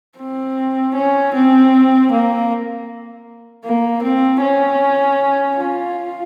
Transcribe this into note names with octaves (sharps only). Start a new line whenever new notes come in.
C4
C#4
C4
A#3
A#3
C4
C#4
F4